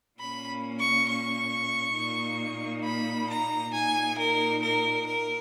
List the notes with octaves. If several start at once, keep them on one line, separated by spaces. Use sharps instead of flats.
A#2 A#3 C#4 B5
C#6
C#6
A#2 A#3 D#4
B5
A#5
A#2 A#3 D#4 G#5
A#4
A#4
A#4